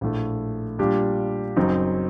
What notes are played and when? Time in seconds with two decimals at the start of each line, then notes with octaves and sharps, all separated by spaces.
0.01 A#1 A2 A3
0.79 A#2 G3 D4 G4
1.56 F#1 F#2 F#3 C4 D#4